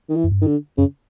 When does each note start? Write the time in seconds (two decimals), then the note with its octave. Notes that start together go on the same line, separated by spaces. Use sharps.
0.09 D#3
0.16 E3
0.24 F#2
0.32 G2
0.41 D#3
0.47 D3
0.77 F#2 C#3